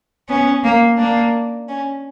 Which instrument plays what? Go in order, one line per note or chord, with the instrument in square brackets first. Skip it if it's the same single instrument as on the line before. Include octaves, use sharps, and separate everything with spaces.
[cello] B3 [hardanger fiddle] C#4
[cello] A#3
[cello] A#3 [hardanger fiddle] D4
[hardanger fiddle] C#4